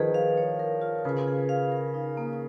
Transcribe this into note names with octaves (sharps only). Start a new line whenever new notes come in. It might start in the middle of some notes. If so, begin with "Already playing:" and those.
Already playing: D#3 F3 G#4 B4
F5
C#5
A#4
F4
C#3 B4
G#4
F5
A#4
D#4
A#3